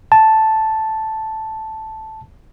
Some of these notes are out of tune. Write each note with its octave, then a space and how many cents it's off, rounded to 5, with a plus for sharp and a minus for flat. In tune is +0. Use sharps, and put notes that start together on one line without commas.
A5 +0